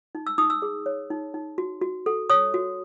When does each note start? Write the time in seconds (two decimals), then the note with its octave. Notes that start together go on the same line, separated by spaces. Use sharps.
0.15 D#4
0.27 E6
0.38 D#4 D#6
0.50 E6
0.62 G#4
0.86 C#5
1.10 D#4
1.34 D#4
1.58 F#4
1.82 F#4
2.06 A4
2.30 C#5 D#6
2.54 F#4